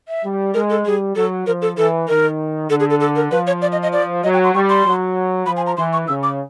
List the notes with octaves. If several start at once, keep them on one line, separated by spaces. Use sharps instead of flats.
E5
G3
G#3 A#4
A4
G3 G#4
F#3 A4
F3 A#4
A4
E3 A4
D#3 A#4
D3 A4
G#4
A4
A4
A#4
F3 B4
C#5
D5
D#5
D#5
D5
F#3 D#5
G5
C6
G3 C#6
C6
F#3
F3 B5
G#5
A#5
E3 C6
C#6
C#3 E6
D6